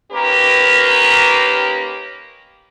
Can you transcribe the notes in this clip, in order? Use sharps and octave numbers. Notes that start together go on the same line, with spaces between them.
D#3 A#3 C#4 G4 A#4 B4